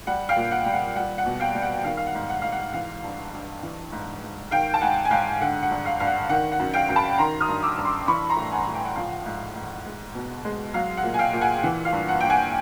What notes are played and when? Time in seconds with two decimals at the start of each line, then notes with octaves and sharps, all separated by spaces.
0.07 G3 F#5
0.29 F5 G5
0.36 A#2
0.51 F#5
0.66 G3
0.73 F#5
0.96 G3 F#5
1.18 F#5
1.26 B2
1.40 F5 G5
1.55 G3
1.62 F#5
1.84 D#3 F5
1.97 F5
2.07 F#5
2.15 G#2
2.30 F#5
2.42 G#2 F5
2.52 F#5
2.73 E3 F5
3.04 G2
3.34 G2
3.63 E3
3.92 G#2
4.23 G#2
4.51 D#3 F5 G5
4.74 A5
4.81 G#2 F#5 G#5
5.05 G#5
5.11 G#2 F5 G5
5.40 D3 F#5
5.63 F#5
5.71 G2
5.86 F5
6.00 G2 F5
6.07 F#5
6.29 D#3 F#5
6.52 F#5
6.59 F#2
6.74 F5 G5
6.89 F#2
6.96 A5 B5
7.18 D#3 A#5 C6
7.41 D#6 F6
7.48 G2
7.62 D6 E6
7.78 G2
7.85 C6 D6
8.08 E3 B5 C#6
8.29 A#5 C6
8.37 A2
8.51 F#5 G#5
8.67 A2
8.74 G5
8.85 F#5
8.96 F3 F5
9.08 F#5
9.26 G#2
9.55 G#2
9.85 G#3
10.15 B2
10.45 G#3
10.74 F#3 F5
10.97 F#5
11.04 A#2
11.14 G#5
11.19 F5 G5
11.33 A#2
11.41 F#5 G#5
11.63 E3 F#5
11.85 F5
11.93 G2
12.08 F#5
12.21 G2 G5
12.30 F#5 G#5